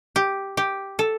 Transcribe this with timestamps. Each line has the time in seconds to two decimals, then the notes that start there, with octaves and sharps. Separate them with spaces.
0.16 G4
0.57 G4
0.99 A4